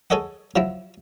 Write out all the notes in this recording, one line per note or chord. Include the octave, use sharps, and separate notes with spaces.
G#4 A4 C#5 D#5 F#5
F3 F#3 E4